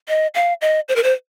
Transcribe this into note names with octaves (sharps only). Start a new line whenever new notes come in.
D#5
F5
D#5
C5
A#4
C5